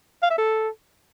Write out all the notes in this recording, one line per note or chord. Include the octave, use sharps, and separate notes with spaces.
F5
E5
A4